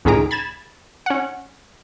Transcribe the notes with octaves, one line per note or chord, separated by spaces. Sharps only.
C#2 A2 D#3 G#4 A#5 D7
B5 G#6 A6 E7
C#4 F#5